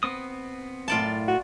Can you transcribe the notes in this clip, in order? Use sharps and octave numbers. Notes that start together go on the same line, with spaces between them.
B3 C4 D#6
F#2 A2 F4 D5 A5
F#4